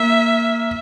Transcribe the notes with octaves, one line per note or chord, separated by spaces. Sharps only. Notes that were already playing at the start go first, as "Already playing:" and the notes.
Already playing: A#3 E5